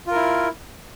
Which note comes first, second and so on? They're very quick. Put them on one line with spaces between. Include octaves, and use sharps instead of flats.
F4 A#4 E4